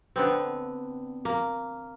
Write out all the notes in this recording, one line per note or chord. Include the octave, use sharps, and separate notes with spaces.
D3 B3 C4
A#3